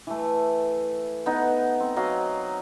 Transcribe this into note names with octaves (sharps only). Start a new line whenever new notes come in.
E3 A3
B3 D#4 F#5
C4
F#3 D#5 F5